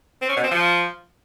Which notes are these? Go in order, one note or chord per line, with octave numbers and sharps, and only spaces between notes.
C4
C#4
B2
C4
F3